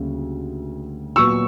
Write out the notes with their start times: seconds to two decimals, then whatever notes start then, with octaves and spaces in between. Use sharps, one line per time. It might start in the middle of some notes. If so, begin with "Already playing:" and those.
Already playing: D2 C#3 G3 A#3
1.16 A#2 F#3 B3 C#6 E6